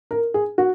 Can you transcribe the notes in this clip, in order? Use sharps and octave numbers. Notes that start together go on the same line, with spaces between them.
A#4
G#4
F#4